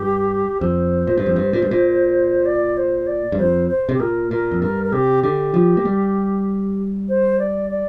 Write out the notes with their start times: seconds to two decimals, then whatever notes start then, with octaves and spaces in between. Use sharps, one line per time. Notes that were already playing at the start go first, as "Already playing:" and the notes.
Already playing: G2 G4
0.61 F2 C5
1.07 A#2
1.17 G2
1.26 F2
1.36 G2
1.53 A#2
1.62 G2
1.71 A#2
2.46 D5
2.77 C5
3.07 D5
3.32 G2
3.39 F2 C5
3.69 C5
3.89 C3
3.94 G4
3.99 A#2 A#4
4.31 A#2 A#4
4.51 F2
4.62 G2 A#4
4.84 A#4
4.92 C3 G4
5.23 D3 G4
5.54 F3
5.77 A#3
5.85 G3
7.08 C5
7.39 D5
7.70 D5